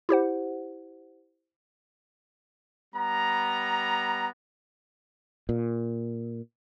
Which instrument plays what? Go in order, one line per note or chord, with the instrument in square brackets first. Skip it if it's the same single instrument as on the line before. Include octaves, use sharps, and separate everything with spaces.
[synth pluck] E4 G4 C5 F#5
[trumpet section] G3 B3 A#5
[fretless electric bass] A#2